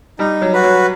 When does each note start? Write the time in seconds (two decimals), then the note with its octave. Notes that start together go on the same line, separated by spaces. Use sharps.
0.19 G3 D#4
0.42 F#3
0.53 F#4 B4
0.64 F#3